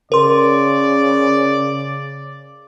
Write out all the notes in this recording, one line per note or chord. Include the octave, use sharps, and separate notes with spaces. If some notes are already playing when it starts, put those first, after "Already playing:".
C#3 A#4 D5 C6